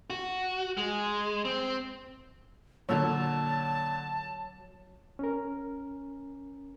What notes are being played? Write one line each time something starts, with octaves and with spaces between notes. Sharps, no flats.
F#4
G#3
C4
A#2 D3 F#3 C#5 A5 E6
C#4 A#4